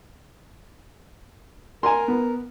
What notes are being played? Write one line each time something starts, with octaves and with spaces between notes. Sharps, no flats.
A#4 G#5 A#5 C6
B3